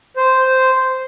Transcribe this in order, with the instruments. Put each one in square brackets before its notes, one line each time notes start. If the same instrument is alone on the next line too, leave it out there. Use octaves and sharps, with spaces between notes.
[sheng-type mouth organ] C5